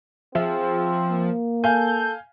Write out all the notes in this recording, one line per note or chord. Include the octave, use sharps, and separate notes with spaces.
F3 C4 G#4 E5
A#3
A4 F5 G#5 G6